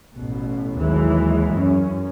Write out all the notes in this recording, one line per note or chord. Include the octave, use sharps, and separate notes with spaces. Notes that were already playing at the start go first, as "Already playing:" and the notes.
A1 B2
D#2 E3 F#3 G#3
F#2 C#4